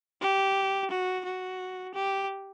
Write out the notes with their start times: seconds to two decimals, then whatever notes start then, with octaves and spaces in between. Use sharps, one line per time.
0.21 G4
0.91 F#4
1.25 F#4
1.94 G4